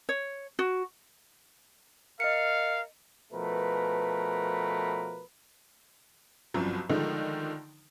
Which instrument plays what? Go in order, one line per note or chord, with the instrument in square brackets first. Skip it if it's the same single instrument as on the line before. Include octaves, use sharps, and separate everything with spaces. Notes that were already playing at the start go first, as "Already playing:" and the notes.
[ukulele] C#5
F#4
[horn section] A#4 F5 [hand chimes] D#5 C#7
[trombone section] B2 F3 A3 A#4 B4
[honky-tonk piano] G1 C2 F#2 F3 F#3
D3 D#3 F3 G#3 A3 D#4